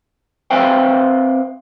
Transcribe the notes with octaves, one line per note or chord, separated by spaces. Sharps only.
C4 B4 C5 E5 F5 G5